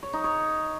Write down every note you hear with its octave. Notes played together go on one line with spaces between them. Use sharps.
C#5
D#4
C#5